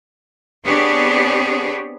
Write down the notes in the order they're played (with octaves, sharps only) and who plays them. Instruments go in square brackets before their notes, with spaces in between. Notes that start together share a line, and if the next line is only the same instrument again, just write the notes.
[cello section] B3 C4 D4 G4 G#4 C#5